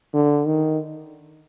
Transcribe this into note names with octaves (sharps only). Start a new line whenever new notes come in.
D3
D#3